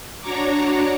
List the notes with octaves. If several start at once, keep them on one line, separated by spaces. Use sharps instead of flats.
D4 F#4 C#5 A#5 C#6 D6